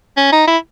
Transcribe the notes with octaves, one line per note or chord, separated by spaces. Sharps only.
C#4
D#4
E4